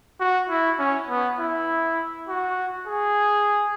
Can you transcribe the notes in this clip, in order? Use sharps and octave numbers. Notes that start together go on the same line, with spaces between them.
F#4
E4
C#4
B3
E4
F#4
G#4